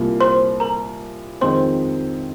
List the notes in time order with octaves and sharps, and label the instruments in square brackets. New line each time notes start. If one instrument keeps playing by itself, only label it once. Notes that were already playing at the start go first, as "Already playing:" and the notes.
Already playing: [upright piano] C2 A#2 A#3 F4
[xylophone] C5 C6
A#4 A#5
[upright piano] F2 D#3 G#3 C4 D#4 [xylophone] C5 C6